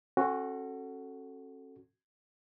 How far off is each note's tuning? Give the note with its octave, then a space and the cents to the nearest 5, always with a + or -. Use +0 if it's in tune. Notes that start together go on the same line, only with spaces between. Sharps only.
C#4 -45 F#4 +5 A4 +0